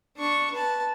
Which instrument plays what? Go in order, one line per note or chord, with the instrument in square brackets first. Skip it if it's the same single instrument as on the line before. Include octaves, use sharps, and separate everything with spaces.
[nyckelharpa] D4 C#6
B4 A5